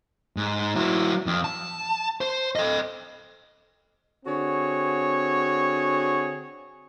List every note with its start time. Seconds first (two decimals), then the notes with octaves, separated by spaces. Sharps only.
0.37 G#2
0.75 F#3 E4
1.26 F2
1.44 A5
2.21 C5
2.56 A4 D#5
4.25 D3 C4 F#4 G#4 C#5